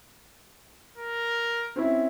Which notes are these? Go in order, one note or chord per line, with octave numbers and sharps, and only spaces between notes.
A#4
C4 C#4 E4